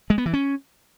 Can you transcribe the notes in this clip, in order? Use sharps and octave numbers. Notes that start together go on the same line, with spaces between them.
G#3
B3
E3
C#4